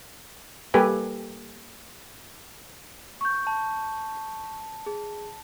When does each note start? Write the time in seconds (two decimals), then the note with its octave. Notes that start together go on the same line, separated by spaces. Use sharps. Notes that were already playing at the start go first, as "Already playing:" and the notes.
0.74 G3 A#3 G4 A4 B4 G#5
3.21 C#6 G6
3.47 A5
4.86 G#4